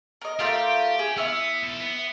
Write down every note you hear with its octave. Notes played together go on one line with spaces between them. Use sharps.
A#4 D#5
A3 F4 G4 A#4
G#4
B3 E4 E6 F6
B1 A4
B3